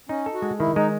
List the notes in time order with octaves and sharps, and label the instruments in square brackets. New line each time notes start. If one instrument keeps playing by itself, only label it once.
[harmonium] C#4 [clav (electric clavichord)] D#4
[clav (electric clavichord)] A4
[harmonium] F#4
[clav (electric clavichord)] G#3
[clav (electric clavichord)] D#3 [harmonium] E4
[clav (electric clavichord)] G#3 [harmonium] D#4